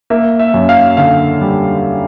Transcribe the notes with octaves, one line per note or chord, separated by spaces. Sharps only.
A#3 E5
E5
F#2
F5
D3 F5
G3